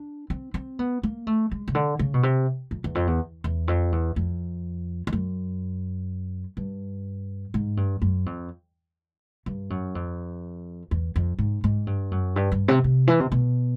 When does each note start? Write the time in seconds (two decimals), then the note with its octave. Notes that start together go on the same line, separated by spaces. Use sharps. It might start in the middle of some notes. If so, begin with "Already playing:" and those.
Already playing: D4
0.30 C4
0.54 C4
0.79 B3
1.03 A#3
1.27 A3
1.51 G#3
1.68 C#3
1.75 D3
1.99 C#3
2.14 B2
2.23 C3
2.71 F2
2.84 E2
2.95 F2
3.07 E2
3.44 E2
3.68 F2
3.92 E2
4.16 F2
5.07 F2
5.13 F#2
6.57 G2
7.54 G#2
7.77 G2
8.02 F#2
8.26 F2
9.46 G2
9.70 F#2
9.95 F2
10.91 E2
11.16 F2
11.39 G#2
11.64 G#2
11.87 G2
12.11 F#2
12.36 G2
12.52 G2
12.68 C3
12.84 C3
13.08 E3
13.20 C3
13.32 B2